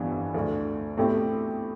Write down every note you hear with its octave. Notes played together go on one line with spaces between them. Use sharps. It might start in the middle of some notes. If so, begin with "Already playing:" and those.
Already playing: G1 F2 E3 G3 B3
D2 D3 A3
B2 A3 C4 E4 G4